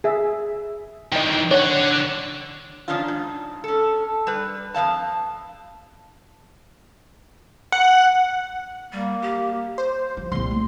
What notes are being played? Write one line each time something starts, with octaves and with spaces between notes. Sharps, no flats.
G#4 E5
D#3 E3 D#5 G5
D4 C#5 F#5
D#3 F3 C#4 D4 F4
G#2
C#4 A4
G3 B4
F2 G#3 F5 A5
F#5
G3 A#3
G4
C5
F3
C2 A#2 C6
A3